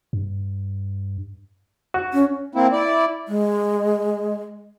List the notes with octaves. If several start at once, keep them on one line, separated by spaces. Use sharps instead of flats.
G2
F#4
C#4
A#3 C4 E4
E4 D5
G#3